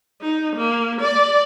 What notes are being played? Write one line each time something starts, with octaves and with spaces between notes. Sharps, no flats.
D#4
A#3
D5